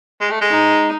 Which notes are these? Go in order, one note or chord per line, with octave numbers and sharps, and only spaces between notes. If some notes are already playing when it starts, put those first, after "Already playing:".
G#3
A3
G#3
D#4